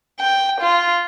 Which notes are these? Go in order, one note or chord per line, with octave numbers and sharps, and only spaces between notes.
G5
F4